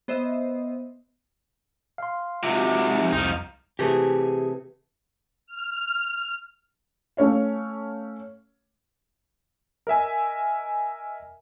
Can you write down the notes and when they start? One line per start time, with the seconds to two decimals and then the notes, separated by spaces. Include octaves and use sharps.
0.08 B3 C5 D#5 E5
1.98 F5 C6
2.43 G#2 C3 F4 F#4
2.98 F3 D#4
3.12 C2 F2 F3 D#4
3.79 C3 E3 A3 G4 G#4
5.47 F6
7.17 A3 C#4 C#5 F5
9.87 A#4 D#5 E5 G#5